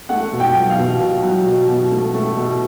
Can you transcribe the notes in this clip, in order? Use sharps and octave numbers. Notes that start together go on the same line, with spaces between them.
A3 F#5
B2
G5
F#3
F5
B2
B2
F#3
B2
B2
A3
A3
B2